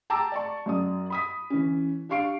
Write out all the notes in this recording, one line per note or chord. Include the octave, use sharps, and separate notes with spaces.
G5 A5 A#5 D6 E6
D5 A5 C#6
F#2 D5 D#6
B5 D#6 B6
E3 C#4
D4 G4 F5 C#6 C7 D7